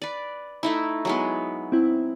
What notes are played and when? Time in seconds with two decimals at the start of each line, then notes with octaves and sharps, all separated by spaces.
0.02 B4 D5
0.63 A3 D#4 E4
1.05 F#3 G#3 B3
1.72 C4 E4